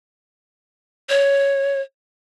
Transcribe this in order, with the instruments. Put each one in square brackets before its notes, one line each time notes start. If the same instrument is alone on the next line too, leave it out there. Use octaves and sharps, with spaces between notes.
[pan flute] C#5